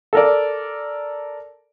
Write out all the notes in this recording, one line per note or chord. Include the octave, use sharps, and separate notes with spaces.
A4 A#4 D5